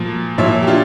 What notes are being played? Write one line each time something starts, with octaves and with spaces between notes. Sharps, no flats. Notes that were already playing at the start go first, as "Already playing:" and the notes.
Already playing: A#2 F3
A#2 F3 C#5 E5
G4
D4 F4